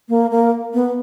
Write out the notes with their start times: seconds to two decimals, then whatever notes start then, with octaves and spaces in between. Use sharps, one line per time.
0.09 A#3
0.31 A#3
0.74 B3